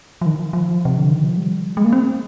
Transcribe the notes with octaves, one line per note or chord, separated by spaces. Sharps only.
F3
D#3
F3
C3
D3
D#3
F3
G3
G#3
A#3
C4